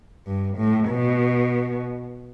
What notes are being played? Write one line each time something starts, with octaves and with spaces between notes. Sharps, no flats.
G2
A2
B2